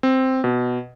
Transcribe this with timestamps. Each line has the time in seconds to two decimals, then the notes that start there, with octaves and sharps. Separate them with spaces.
0.03 C4
0.44 B2